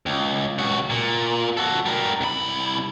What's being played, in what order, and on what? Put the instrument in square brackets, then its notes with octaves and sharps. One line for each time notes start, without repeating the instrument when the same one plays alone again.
[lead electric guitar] C#2
C#2 F#4
A#2
F#4 A4
G3 A#4
C2 B5